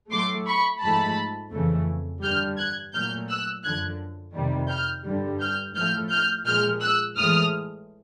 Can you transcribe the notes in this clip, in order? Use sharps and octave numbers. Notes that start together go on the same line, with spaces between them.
A2 F#3 A3 C6 D6
B5 C#6
G#2 F3 A3 A5 B5
F2 C#3 E3 A3
G2 D3 G3 F6 G6
F#6 G#6
A#2 F#3 A3 F6 G6
E6 F#6
F#2 D3 F3 F#6 G#6
F2 C3 D#3 G3
F6 G6
G2 D3 G3
F6 G6
A2 F3 A3 F6 G6
F6 G6
A#2 F3 G#3 F6 G6
E6 F#6
A2 E3 G#3 D#6 F6